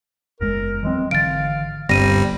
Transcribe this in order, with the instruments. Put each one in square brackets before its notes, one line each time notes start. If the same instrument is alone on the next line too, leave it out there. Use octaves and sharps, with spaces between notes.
[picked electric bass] F#1 E2 G#3 [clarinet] A#4
[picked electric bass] E3 F#3 C4 [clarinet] G#3
[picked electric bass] G#1 D3 E3 [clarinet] F5 [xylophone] A6 D7
[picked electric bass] D1 G2 C4 [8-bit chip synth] G1 G3 [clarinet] C5 [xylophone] A#6 D#7